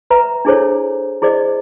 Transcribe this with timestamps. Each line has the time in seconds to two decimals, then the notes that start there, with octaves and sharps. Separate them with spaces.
0.10 B4 E5 A#5
0.45 D4 E4 G#4 A4 C5 C#5
1.22 E4 G#4 C5 D5 D#5